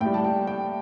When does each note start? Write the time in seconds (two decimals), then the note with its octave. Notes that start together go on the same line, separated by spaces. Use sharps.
0.01 A2 G5
0.05 G3
0.14 A5
0.24 G5
0.47 G5